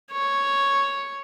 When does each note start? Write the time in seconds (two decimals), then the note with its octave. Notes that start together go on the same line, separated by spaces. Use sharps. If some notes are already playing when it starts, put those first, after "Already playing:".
0.12 C#5